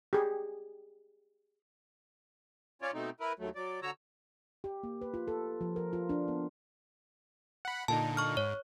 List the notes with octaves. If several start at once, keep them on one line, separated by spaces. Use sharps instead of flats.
G4 G#4
C#4 F4 C#5 D5
B2 A3 C4 D#4
E4 A#4 B4
D#2 F#3 A3
F#3 D5
D3 F#4 C#5 A#5 E6
G4
A#3
B4
F4
A4
F3
A#4
F4
D4
B3
F#5 B5
A#2 D3 D#4 A5
C#6 F6
G#2 C#5